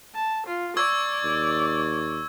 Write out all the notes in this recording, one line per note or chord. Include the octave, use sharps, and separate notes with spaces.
A5
F4
D5 C#6 E6 G#6
D#2